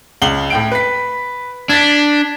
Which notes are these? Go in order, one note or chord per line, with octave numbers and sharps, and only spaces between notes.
C#2 F#7 G7
A2 G5 D7
B4 B6
D4 G#6 A6 B6